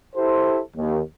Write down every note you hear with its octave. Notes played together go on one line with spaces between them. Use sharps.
E4 G4 A4 C5
D#2